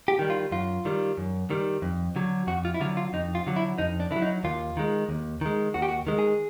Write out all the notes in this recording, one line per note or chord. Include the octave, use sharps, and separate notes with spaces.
G4
D#3 G3
F4
F#2 F4
D#3 G3
F#2
D#3 G3
F2
D3 F#3
F2 F#4
F4
E4
D3 F#3 F4
F4
F2 D#4
F4
D3 F#3
E4
F2 D#4
D4
D3 F#3 E4
D#4
D#2 F4
D#3 G#3
D#2
D#3 G#3
D#2 F#4
G4
F#4
D#3 G#3
G#4